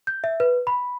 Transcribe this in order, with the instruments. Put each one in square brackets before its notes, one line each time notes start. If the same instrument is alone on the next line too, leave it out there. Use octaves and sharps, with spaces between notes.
[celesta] G6
E5
B4
B5